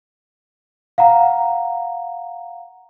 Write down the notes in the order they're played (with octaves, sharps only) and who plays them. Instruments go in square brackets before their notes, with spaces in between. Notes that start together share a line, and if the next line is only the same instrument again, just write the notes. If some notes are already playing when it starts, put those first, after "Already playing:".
[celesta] F5 F#5 A#5